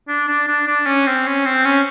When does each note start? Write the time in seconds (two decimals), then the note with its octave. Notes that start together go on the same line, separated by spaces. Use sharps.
0.08 D4
0.28 D4
0.48 D4
0.67 D4
0.86 C#4
1.07 C4
1.26 C#4
1.45 C4
1.65 C#4